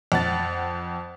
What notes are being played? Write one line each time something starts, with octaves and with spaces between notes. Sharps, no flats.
F2 F#5 A6